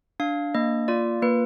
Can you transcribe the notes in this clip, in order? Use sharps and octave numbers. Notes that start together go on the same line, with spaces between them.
D4 F5
A#3 D#5
F4 D5
A#3 B4